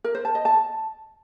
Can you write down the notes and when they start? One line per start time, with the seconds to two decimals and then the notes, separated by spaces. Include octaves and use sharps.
0.04 A#4
0.15 C5
0.25 A5
0.35 D#5
0.45 A5